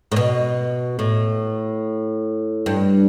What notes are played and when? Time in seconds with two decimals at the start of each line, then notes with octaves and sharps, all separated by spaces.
0.12 A2
0.16 B2
0.99 A2
2.66 G2